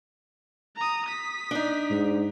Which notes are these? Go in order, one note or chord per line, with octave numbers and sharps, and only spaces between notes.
A#5 D#6
D#6 B6
D4 D#4
G#2